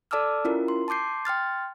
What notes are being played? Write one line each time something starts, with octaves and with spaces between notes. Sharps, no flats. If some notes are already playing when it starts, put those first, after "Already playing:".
A4 D5 A5 D6 E6 F6
C#4 E4 F4 A#4
C6
A5 C6 D6 G6 C7
G5 C6 F6 A6